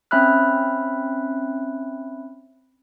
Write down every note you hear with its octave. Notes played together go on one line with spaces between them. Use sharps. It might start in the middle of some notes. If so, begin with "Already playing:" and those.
C4 C#4 E5 B5 F6 F#6